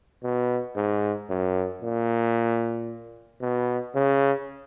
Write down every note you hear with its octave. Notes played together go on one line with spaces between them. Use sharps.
B2
G#2
F#2
A#2
B2
C#3